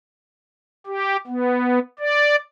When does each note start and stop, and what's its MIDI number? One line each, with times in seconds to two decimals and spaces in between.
0.87 1.17 67
1.27 1.79 59
1.99 2.36 74